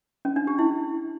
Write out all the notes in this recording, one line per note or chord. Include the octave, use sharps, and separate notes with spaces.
C#4
D4
G4
E4